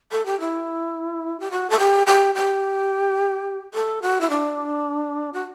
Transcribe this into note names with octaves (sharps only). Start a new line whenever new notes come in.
A4
G4
E4
G4
F#4
A4
G4
G4
G4
A4
F#4
E4
D4
F#4